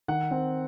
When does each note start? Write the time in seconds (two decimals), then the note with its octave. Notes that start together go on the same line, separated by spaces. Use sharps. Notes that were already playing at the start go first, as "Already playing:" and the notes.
0.08 D#3 F#5
0.31 C4